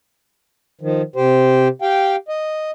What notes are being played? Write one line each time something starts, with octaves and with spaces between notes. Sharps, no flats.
D#3 F3
C3 G4 C5
G4 F5 G5
D#5